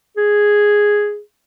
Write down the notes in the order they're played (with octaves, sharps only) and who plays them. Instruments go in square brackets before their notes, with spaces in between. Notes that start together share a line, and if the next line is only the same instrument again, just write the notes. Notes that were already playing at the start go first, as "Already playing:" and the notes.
[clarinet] G#4